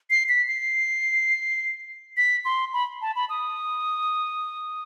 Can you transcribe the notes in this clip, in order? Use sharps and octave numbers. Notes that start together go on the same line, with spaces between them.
C7
B6
C7
B6
C6
B5
A5
B5
D#6